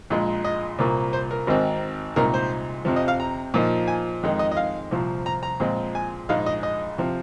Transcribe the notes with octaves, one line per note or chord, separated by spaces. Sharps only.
A#1 A#2 G#3
D#5
C2 A#2 A#3
C5
A#4
G#1 G#2 D#3 C4
C2 A#2 G#3 C4 D#4 A#4
C5
F2 C3 F3
D#5
F5
A#5
A#2 F3 A#3 D#4
G#5
F2 D#3 G#3 D#4
D#5
D#5
F5
C2 A#2 F3
A#5
A#5
A#2 F3 G#3 C4
G#5
A#1 G#2 G#3 D#4 F5
D#5
D#5
C3 F3